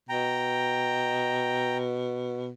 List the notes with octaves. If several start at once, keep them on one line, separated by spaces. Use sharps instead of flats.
B2 G5 A#5